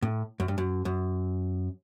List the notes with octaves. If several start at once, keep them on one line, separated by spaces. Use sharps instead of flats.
A2
F#2
G2
F#2
F#2